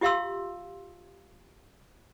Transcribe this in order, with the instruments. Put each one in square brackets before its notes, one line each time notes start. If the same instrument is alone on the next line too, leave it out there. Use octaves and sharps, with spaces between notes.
[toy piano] F4 G4 E5 F5 C6 E6